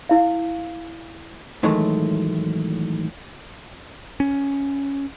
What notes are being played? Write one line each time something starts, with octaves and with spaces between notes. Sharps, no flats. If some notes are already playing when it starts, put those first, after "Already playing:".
E4 F5
A2 D#3 E3 F#3 G#3 A3
C#4